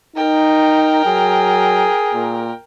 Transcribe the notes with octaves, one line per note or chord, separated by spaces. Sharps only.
D#4 A#4 G5
F#3 G#4
A#2